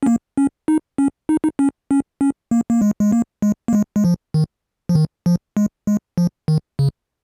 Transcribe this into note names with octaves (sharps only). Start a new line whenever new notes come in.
C#4
A#3
C#4
D#4
C#4
D#4
D#4
C#4
C#4
C#4
A#3
A#3
G#3
G#3
A#3
G#3
A#3
G#3
G#3
F3
D#3
F3
D#3
F3
G#3
G#3
F3
D#3
C#3